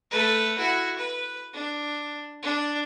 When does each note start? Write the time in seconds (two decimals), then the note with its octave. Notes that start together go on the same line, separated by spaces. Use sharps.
0.11 A3 B4
0.58 E4 F#4
0.98 B4
1.53 D4
2.43 D4